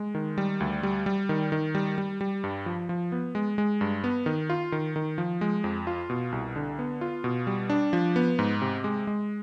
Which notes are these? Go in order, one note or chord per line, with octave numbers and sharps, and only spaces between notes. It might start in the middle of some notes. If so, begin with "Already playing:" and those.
Already playing: G#3
D#3
G3
D2
G3
G3
D#3
D#3
G3
G3
G3
G2
F3
F3
B3
G#3
G#3
G2
B3
D#3
F4
D#3
D#3
F3
G#3
F2
F4
B2
C2
D3
B3
F4
B2
G3
D4
F3
B3
G#2
C3
G#3
G#3